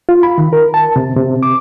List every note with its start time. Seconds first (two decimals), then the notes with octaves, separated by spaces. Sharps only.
0.09 F4
0.23 B5
0.38 D#3
0.53 A#4
0.74 A5
0.96 C3
1.16 C3
1.43 D6